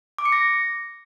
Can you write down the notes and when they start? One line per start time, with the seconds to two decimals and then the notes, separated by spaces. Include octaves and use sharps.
0.18 D6
0.25 C#7
0.32 A#6